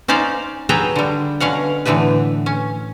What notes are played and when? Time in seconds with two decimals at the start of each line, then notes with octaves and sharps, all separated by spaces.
0.08 C#4 D#4 C5 D5 F5
0.69 F#3 G#4 A4 B4 G5 A#5
0.96 D3 G3
1.40 B2 D3 C#4 F5 F#5
1.85 A2 D3 E3 B3 B4
2.46 C#4